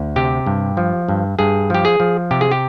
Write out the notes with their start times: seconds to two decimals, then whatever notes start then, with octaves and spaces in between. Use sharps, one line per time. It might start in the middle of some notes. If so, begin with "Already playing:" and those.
Already playing: D2
0.16 C3 G4
0.46 G2
0.77 F3
1.09 G2
1.39 G2 G#4
1.70 F3 G4
1.85 G#4
2.00 F3
2.31 C3 G4
2.41 G#4
2.51 G4